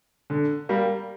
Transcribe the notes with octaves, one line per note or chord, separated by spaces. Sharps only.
D3
G3 A#3